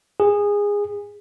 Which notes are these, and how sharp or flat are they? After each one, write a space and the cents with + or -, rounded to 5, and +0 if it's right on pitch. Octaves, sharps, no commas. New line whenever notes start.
G#4 -20